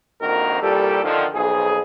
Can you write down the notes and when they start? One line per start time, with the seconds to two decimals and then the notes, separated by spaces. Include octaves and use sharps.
0.22 A#1 F2 D#3 A#3 F#4 A#4
0.61 C2 A#2 G3 G4 A4
1.04 D3 D#3 F3
1.34 B1 F2 G#4